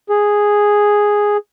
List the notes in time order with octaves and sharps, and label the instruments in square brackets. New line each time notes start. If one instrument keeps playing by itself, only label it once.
[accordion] G#4